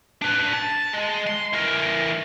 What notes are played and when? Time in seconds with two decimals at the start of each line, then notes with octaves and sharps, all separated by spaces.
0.22 D4 B4
0.53 A5
0.93 G#3
1.27 C6
1.53 E3 A#4